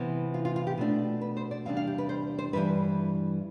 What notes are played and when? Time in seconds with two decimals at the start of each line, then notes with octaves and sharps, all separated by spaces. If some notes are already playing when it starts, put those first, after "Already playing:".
Already playing: C3 E3 B3
0.34 F4
0.45 F4
0.56 F4
0.67 G4
0.78 B2 A3 D4 F4
1.21 B4
1.37 C5
1.51 D5
1.65 E2 C3 G3 D4 F5
1.77 F5
1.87 G4
1.98 B4
2.09 C5
2.39 C5
2.53 G2 E3 G3 B4